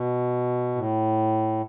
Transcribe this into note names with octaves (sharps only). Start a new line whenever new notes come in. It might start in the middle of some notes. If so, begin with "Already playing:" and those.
Already playing: B2
A2